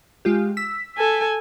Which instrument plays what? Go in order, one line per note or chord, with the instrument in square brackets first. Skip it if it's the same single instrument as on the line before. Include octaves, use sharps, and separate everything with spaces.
[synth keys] G#3 F4 G4
E6 B6
[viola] A4 G#5